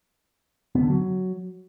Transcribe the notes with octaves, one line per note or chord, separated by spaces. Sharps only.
B3
D3
F#3